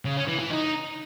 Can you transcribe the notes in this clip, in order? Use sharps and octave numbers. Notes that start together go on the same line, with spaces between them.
C#3
C#4
E3
E3
D#4